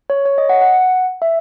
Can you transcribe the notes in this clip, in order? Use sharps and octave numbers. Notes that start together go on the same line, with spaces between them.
C#5
C#5
D#5
F#5
F#5
E5